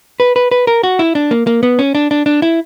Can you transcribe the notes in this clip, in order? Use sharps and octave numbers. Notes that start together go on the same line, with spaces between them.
B4
B4
B4
A#4
F#4
E4
D4
A#3
A#3
B3
C#4
D4
D4
D4
E4